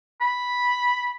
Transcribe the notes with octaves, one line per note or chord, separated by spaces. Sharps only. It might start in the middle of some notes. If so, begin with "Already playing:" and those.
B5